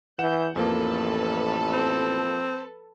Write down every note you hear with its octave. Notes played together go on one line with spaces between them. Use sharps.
E3 F#5 G6 E7
A1 F2 F3 A#3 A4 B4 A5
C4